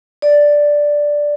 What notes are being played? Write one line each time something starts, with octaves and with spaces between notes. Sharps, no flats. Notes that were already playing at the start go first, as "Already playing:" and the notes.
D5